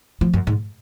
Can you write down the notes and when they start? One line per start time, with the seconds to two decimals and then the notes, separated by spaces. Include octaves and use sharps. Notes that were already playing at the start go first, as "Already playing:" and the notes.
0.21 F3
0.33 F#2
0.47 G#2